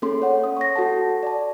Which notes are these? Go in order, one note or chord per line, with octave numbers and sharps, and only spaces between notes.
A#3 C#4 G#4 A4 C6
C#5 F#5
D#6
C#6 A#6
F#4 A4 F#5 A5
D5 A5